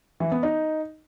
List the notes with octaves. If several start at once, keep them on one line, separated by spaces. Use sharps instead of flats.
E3
B3
D#4